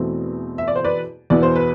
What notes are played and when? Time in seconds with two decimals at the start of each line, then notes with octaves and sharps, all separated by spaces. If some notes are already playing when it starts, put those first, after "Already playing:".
Already playing: E2 B2 A3 C4 E4
0.58 E5
0.68 D5
0.76 C5
0.84 B4 D5
1.30 E2 B2 B3 E4 D5
1.43 C5
1.56 B4